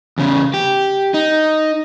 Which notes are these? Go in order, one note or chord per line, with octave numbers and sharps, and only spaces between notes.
E2 C#3
G4
D#4